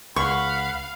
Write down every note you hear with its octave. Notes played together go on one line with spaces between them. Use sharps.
C#2 F5 F#5 B5 C#6